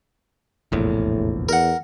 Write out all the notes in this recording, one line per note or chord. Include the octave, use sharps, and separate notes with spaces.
F1 A#1 E2 A2
E2 A#4 F#5